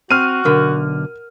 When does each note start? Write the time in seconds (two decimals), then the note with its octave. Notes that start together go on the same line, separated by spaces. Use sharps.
0.11 C4 F#4 F6 D#7
0.45 B1 D3 A#4 F#5 B5